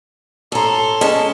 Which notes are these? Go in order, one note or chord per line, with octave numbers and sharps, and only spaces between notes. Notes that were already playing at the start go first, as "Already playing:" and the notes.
A2 A4 A#5 C6
G#3 C#4 A5